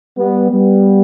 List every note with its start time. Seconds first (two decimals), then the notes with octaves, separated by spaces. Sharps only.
0.17 G3 B3
0.50 G3 B3